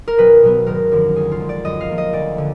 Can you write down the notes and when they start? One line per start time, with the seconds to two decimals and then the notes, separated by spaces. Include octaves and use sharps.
0.08 A#4
0.18 B1 B4
0.43 B2 F#3 B3
0.66 G#1 A#4
0.92 F#2 D3 F3
1.16 D2 G#4
1.32 F4
1.40 D3 G#3
1.49 D5
1.65 F#2 D#5
1.81 F5
1.89 F3 A#3
1.98 D#5
2.13 D2 D5
2.38 D3